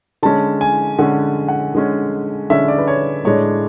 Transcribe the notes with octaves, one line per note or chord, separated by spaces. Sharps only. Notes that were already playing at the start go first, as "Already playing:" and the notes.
D3 G#3 C#4 A5
G#5
D3 G#3 C#4 F#5
F#5
D3 G#3 C#4
D3 G#3 C#4 E5
D5
B4
C#5
A2 G#3 D4 C#5